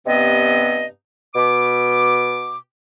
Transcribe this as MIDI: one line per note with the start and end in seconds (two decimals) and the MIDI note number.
0.06 0.85 43
0.06 0.85 48
0.06 0.85 59
0.06 0.85 60
0.06 0.85 75
1.35 2.55 47
1.35 2.55 86